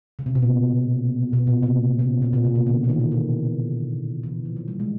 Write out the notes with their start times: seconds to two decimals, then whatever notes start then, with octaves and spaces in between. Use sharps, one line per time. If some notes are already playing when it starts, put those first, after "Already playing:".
0.19 C#3
0.26 C3
0.35 B2
0.42 A#2
1.33 B2
1.47 A#2
1.63 C3
1.99 C#3
2.22 B2
2.33 A#2
2.44 B2
2.55 C#3
2.67 D3
2.84 E3
2.89 D#3
3.00 D#3
3.12 E3
4.23 E3
4.45 F3
4.56 F#3
4.68 G3
4.80 G#3